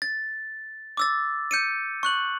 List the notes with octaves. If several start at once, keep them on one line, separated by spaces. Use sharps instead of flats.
A6
D6 E6 A6
G6 C#7 D#7
C#6 F#6 F#7